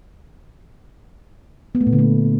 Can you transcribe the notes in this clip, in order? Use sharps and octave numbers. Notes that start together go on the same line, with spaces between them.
B3
A3
A#2
D3
A3